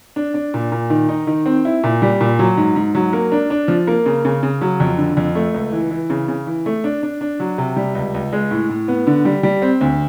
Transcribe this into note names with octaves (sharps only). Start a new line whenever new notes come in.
D4
D4
A#2
A#2
D#3
D#4
D#3
C4
E4
A#2
G3
A#2
F#3
G#2
G#2
F#3
A#3
D4
D4
F3
A#3
C#3
C#3
C#3
F#3
F2
D3
F2
A3
C#2
E3
E3
C#3
C#3
E3
A3
D4
D4
D4
F#3
C3
G3
C#2
C#2
G#3
A2
A2
B3
D3
G3
G3
C4
D2